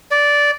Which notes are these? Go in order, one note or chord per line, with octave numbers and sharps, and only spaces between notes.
D5